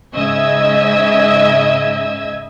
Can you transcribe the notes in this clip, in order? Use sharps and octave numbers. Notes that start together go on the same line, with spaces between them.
G#2 C#3 D#5 E5 E6 G#6